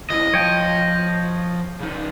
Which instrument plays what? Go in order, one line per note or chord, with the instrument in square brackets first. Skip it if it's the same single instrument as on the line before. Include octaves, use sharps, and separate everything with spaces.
[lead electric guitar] C#2 E4 [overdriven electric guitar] D#5
[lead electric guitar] F3 F5 [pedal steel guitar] C#5 G5
[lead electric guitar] C#3 D#4